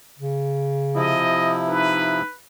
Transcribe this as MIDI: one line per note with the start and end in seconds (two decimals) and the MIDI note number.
0.19 1.26 49
0.95 2.22 48
0.95 2.22 53
0.95 2.22 64
0.95 1.61 75
1.68 2.26 63
1.68 2.36 71